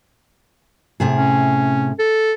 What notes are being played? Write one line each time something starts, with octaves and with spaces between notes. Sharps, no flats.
A2 C3 G#4
C#4
A4